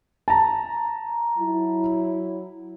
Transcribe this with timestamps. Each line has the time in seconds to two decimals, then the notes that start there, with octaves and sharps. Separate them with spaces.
0.28 A5 A#5
1.38 F#3 E4